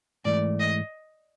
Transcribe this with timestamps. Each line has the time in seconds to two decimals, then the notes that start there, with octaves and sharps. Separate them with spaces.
0.25 G#2 E3 A3 D5
0.59 D#5